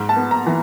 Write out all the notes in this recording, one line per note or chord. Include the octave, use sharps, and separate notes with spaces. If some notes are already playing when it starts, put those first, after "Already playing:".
Already playing: G#2
A5
B3
A#5
E3